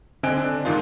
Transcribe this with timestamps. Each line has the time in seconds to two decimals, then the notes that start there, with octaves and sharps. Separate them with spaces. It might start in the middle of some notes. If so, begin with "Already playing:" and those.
0.23 D3 C4 D#5 G#5 F#6 D7
0.37 D4
0.65 G#2 D#3 D#4 F4